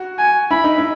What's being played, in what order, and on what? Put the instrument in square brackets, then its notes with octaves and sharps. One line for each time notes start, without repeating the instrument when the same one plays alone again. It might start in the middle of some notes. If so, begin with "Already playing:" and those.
Already playing: [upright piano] F#4
[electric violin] G#5
[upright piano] E4 [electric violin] B5
[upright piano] D#4
E4